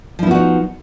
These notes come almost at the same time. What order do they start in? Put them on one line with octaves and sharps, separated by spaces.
F3 E4 B3 F#4 D#4